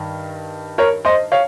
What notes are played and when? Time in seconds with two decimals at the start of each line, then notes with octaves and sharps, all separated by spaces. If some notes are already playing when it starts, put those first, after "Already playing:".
Already playing: G2 D#3
0.78 A#4 C#5
1.05 C5 D#5
1.32 C#5 F5